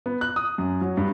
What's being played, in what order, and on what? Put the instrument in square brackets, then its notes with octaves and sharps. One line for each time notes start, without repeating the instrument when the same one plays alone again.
[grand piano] B3
F#6
D#6
F#2
F#3
G2